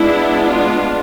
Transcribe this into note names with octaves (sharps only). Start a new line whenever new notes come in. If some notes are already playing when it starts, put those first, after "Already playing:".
Already playing: G#3 B3 D4 E4
F4